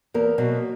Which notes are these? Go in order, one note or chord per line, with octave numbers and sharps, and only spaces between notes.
E2 A#3 A#4
B2 F#3